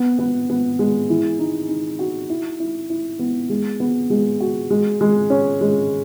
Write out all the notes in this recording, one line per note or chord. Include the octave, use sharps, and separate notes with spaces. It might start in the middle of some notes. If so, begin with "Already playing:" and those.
Already playing: B3
B3
B3
G#3
E3
D#4
D#4
F#4
E4
E4
E4
B3
G#3
B3
G#3
F#4
G#3
G#3
C#4
G#3